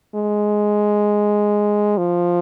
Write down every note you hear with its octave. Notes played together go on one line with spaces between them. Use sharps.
G#3
F3